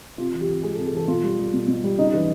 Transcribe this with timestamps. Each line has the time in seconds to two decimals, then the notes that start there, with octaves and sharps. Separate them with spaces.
0.18 C3 F4
0.33 E3
0.41 G4
0.49 C3
0.63 G#3 G#4
0.75 A4
0.78 C3
0.86 G#4
0.93 E3 A4
1.08 B2 F4
1.23 G3
1.39 G3
1.54 B2
1.68 B2
1.84 G3
1.98 C#3 D#4
2.13 E3